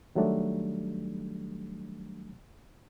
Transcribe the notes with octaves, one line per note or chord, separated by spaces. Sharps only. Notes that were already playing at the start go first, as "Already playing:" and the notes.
D#3 F#3 G3 A3 D4